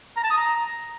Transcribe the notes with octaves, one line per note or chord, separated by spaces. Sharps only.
A#5
A5
D#6
A#5